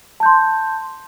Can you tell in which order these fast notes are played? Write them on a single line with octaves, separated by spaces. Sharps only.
A5 G6 C6